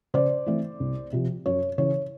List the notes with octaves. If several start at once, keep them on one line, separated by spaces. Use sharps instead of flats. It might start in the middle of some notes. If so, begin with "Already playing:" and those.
C#3 C5 D5
E3 A3 C4
C2
C3 F3
F#2 C#5
C#3 E3 C#5